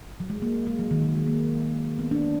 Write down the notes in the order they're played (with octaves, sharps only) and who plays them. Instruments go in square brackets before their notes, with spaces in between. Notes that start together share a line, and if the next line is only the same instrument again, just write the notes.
[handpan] F#3
G#3
A#3
G#3
F#3
D#3
F#3
G#3
A#3
B3
D4